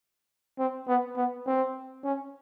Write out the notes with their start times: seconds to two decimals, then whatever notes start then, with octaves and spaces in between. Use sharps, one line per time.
0.58 C4
0.87 B3
1.16 B3
1.47 C4
2.04 C#4